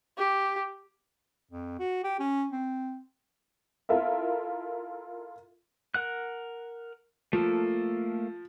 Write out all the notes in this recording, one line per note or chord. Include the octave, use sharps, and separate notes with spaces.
G4
F2
F#4
G4
C#4
C4
E4 F4 A4 A#4 E5
A#4 F#5 F#6
F3 A3 A#3 A4